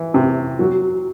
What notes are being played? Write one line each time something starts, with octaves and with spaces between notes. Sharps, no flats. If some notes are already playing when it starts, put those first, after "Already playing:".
Already playing: E3
C3
F#3